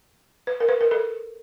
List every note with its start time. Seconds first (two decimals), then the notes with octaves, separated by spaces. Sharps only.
0.47 B4
0.60 A#4
0.69 B4
0.81 A#4
0.91 A4